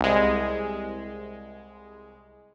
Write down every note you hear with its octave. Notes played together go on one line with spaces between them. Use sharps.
C2 G#3